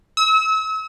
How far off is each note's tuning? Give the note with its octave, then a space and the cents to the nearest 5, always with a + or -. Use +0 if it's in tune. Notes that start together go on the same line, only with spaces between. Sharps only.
E6 -40